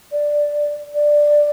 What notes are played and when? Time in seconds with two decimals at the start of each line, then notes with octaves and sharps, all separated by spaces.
0.12 D5
0.95 D5